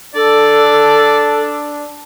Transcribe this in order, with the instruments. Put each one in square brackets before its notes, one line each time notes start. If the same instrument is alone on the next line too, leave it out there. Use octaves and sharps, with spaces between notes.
[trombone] D4 [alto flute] A4 [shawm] D5